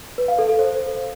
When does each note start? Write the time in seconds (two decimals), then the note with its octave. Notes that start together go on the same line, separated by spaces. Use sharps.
0.18 B4
0.28 F5
0.39 A4
0.49 A4
0.59 C5